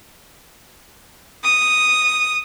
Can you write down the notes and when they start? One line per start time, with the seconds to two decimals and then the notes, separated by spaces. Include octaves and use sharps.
1.44 D#6